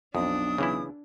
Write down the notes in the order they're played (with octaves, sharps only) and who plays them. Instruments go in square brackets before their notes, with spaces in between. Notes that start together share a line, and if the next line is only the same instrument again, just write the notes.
[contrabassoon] B1 [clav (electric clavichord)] F2 [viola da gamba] D4 [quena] D#6
[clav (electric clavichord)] C#3 E3 E4